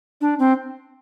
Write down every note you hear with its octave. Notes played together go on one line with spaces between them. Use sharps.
D4
C4